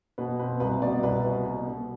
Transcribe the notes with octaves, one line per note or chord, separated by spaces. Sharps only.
B2 B4
C4 B4
C2 B4
B2 D5
C2 B4
B2
B2
B2